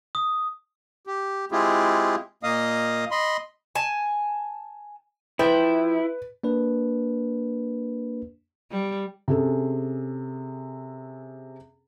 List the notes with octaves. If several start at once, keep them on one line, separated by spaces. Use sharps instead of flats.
D#6
G4
G#3 C4 E4 F4 G4 G#4
A#2 A#3 D#5 F5 D#6
D#5 B5 C6
G#5 A5
F3 E4 B4 G5
A#3 D4 B4
G3
C3 C#4 G#4 A4